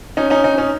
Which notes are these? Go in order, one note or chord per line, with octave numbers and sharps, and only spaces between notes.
C#4 D#4
C#4 D#4
C#4 D#4
C#4 D#4